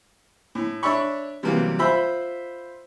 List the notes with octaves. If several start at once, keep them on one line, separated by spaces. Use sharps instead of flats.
A2
D4 C#5 E5 B5 C#6
C3 E3 F#3 G3 A#3 B3
F4 C5 E5 B5